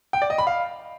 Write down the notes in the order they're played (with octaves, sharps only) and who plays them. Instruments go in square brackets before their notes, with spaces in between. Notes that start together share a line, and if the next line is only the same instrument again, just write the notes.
[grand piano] G5
D5
D#5
B5
F5